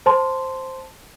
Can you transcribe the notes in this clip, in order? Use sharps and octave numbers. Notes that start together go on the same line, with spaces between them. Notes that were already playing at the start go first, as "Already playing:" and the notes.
C5 A5 C6